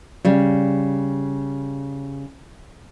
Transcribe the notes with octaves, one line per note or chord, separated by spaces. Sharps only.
C#3 G3